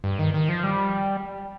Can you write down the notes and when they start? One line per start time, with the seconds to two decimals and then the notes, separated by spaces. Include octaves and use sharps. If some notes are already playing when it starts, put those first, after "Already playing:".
0.04 G2
0.19 D#3
0.34 D#3
0.49 F3
0.63 G3